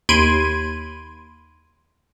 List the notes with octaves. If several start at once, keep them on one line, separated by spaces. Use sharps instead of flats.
D#2 B5 C6 G#6 D7 D#7